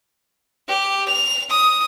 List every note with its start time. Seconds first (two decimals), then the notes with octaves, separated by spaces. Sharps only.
0.69 G4
1.08 F7
1.50 D#6